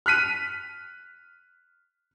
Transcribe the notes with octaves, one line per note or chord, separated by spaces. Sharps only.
F6 F#6 B6 D#7